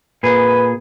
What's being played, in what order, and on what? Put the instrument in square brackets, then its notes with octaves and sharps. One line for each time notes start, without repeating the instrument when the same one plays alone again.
[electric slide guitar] A#2 G#4 [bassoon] B4